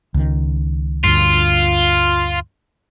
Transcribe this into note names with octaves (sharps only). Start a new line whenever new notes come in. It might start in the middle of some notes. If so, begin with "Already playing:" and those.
C#2 D#3
D2 G2 F4